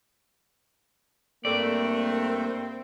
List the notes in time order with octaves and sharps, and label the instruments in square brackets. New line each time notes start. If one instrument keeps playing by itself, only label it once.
[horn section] G2 A3 [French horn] A#3 [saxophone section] C4 [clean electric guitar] D5